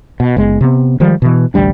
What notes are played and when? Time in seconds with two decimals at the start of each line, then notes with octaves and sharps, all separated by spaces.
0.20 B2
0.37 F#1 G#3 B3
0.61 C3 B3
1.00 D#3 F3 G3 G#3
1.22 B2 E3
1.54 A1 D2 G3 D4